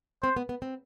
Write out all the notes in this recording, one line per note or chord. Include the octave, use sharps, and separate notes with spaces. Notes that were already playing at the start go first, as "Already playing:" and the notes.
C4 C5
B3
B3
C4